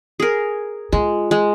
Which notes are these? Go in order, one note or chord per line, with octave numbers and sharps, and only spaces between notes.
G#4 A#4
G#3 F4
G#3